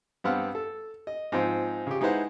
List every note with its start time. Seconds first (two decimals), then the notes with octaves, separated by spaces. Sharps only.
0.24 G2 B3 C4 F5 F#5 F6
0.55 A4
1.07 D#5
1.32 G#2 F3 C4
1.87 C#3 G4
2.01 G#3 D#4 E4 B4 C5 F#5